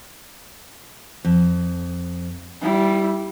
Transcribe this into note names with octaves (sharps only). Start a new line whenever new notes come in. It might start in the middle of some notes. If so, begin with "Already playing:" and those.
F2
G3 E4